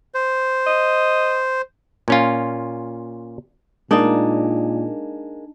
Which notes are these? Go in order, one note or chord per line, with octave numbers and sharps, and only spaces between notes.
C5
D#5
A#2 C#4 F4
A#2 G#3 A#3 D4 D#4